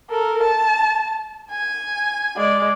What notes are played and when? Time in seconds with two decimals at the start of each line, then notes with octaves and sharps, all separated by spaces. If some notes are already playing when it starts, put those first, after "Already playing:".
0.10 A4 A#4
0.43 A5
1.50 G#5
2.37 G#3 D5